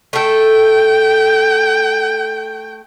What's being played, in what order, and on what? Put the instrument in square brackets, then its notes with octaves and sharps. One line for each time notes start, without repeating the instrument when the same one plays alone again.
[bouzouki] A3 A4 [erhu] G5